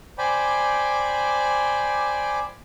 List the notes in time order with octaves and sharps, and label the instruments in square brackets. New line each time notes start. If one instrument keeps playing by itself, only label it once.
[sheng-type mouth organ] C5 D5 G5 G#5 B5 D6